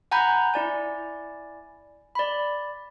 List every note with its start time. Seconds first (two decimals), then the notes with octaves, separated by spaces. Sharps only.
0.11 F#5 G#5 A#5 B5 G6
0.54 E4 D5 G#5
2.15 D5 B5